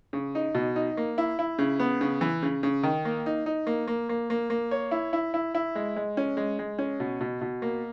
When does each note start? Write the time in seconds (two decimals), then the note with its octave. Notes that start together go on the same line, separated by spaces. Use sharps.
0.13 C#3
0.35 D#4
0.55 B2
0.76 D#4
0.97 A#3
1.18 E4
1.39 E4
1.59 C#3
1.80 B3
2.01 C#3
2.21 E3
2.43 C#3
2.63 C#3
2.83 D#3
3.05 A#3
3.26 D#4
3.46 D#4
3.67 A#3
3.87 A#3
4.09 A#3
4.30 A#3
4.50 A#3
4.71 C#5
4.91 E4
5.13 E4
5.34 E4
5.55 E4
5.75 G#3
5.96 G#3
6.17 C#4
6.37 G#3
6.59 G#3
6.79 C#4
7.00 B2
7.21 B2
7.41 B2
7.62 A#3